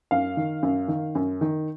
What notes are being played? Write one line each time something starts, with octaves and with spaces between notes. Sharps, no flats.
F#2 F5
D#3
F#2
D#3
F#2
D#3